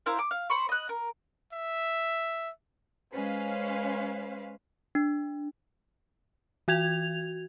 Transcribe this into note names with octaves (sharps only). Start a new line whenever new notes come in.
E4 A#4 C5 F5
D6
F5
C5 B5 C#6
D#5 F#6
A#4
E5
G#3 C#4 B4 C5 F5
D4
E3 F#4 G#6 F7